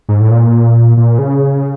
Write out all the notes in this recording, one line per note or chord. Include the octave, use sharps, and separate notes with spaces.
G#2
A2
A#2
A#2
C#3